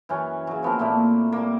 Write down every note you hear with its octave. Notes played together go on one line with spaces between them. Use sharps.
F#2 E3 C#4
C#3 F#3
F3 B3 C4 A#4
A#2 A3 A#3 E4
G3 A#3